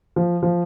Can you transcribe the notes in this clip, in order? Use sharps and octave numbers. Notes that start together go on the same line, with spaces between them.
F3
F3